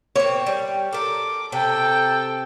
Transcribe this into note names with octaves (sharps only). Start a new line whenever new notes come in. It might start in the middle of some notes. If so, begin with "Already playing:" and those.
A#3 C4 C#5
G3
A4 A#4 D6
C3 A4 G5